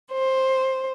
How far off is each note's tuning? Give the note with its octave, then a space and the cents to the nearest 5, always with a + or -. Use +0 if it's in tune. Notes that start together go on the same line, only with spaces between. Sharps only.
C5 +10